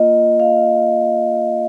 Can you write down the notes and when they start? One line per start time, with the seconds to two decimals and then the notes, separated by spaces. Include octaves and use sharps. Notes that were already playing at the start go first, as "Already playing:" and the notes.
Already playing: A#3 F4 D#5
0.40 F5